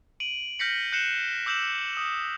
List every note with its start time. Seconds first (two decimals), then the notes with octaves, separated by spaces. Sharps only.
0.20 D7 D#7 F#7
0.59 F6 G6 A#6 B6 C#7 F#7
0.92 F#6 G6 C7 C#7 E7 G7
1.46 D6 E6 G6 E7 F#7
1.97 D#6